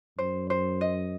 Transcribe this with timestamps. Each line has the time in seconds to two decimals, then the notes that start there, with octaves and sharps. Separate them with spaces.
0.18 F#2 C5
0.50 C5
0.81 D#5